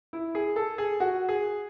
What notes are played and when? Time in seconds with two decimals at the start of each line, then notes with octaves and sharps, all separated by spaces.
0.13 E4
0.35 G#4
0.56 A4
0.78 G#4
1.00 F#4
1.29 G#4